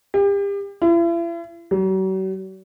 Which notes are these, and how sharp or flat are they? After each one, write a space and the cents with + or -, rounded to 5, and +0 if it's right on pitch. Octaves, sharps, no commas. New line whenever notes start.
G4 +35
E4 +40
F#3 +45